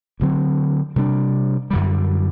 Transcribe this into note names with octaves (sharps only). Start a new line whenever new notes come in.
D2 D3 F#3 C4
C3 G3 D4
F#2 D3 G3